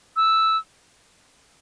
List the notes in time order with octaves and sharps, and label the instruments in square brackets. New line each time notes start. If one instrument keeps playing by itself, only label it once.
[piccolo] E6